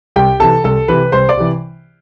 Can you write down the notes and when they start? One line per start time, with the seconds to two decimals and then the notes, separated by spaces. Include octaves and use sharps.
0.16 C2 G4 G5
0.40 C3 E3 A4 A5
0.64 C2 A4 A5
0.88 C3 E3 B4 B5
1.12 C2 C5 C6
1.29 D5 D6
1.37 C3 E3